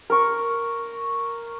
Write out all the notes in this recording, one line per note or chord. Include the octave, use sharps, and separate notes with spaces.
A#4 C#6